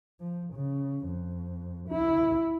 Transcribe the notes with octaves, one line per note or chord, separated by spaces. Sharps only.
F3
C#3
F2
E4